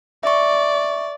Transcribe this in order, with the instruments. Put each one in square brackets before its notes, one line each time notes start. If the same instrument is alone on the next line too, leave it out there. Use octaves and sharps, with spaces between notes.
[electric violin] D5 [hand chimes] E5 C#6